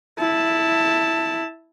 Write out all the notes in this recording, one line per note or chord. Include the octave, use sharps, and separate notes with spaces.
E4 A5